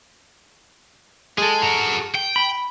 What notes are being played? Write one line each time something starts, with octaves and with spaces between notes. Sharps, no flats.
G#3 G#4 A4
F#4 A#4
G5
B5